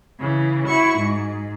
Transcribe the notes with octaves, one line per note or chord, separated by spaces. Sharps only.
C#3 E3
E4 F#4 C#6
G#2